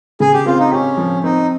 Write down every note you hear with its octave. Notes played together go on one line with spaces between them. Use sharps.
C#3 G#4
G4
C4 F4
D#4
C#4 G4
F3
C4 D#4